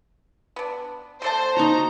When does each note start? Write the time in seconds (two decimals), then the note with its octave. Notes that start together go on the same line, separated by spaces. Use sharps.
0.56 B3 D4
1.22 D3 A3 C5 A5
1.57 D#4 F#4 A#5